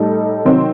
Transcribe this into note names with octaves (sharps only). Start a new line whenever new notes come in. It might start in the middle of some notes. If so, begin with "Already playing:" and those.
Already playing: A2 G3 D#4 A4
C3 D#3 F#3 C4 D#4